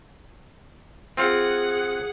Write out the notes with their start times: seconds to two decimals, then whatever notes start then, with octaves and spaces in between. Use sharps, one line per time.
1.17 C4 F4 G#4 F#5